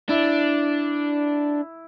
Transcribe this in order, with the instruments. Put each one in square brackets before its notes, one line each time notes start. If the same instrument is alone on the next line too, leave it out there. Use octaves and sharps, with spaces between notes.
[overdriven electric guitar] D4 [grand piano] E4